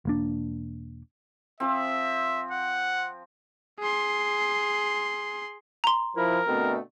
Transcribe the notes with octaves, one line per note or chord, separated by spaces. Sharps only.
E1 A#3 D4
F3 C4 E5
F#5
G#4 C6
A#5 C6
F3 E4 A#4
B2 D3 A3 C4